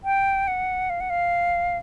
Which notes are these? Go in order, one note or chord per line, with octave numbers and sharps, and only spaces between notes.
G5
F#5
F5
F#5
F5